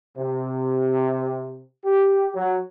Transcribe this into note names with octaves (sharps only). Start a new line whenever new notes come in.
C3
G4
F#3